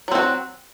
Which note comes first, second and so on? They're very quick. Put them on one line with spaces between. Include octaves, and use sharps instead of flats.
F#3 C4 F#4